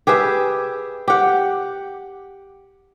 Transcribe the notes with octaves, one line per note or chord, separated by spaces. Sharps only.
G4 G#4 B4 E5
G4 F#5